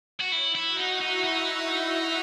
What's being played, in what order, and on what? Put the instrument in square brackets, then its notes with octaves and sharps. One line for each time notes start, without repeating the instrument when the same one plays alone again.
[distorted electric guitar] F#4
[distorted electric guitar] E4 [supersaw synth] C#5 C#6
[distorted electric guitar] E4
[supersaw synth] F#4 F#5
[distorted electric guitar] D#4
[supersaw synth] E4 E5
[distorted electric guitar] D#4
[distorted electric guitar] D#4 [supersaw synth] E4 E5
[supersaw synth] F#4 F#5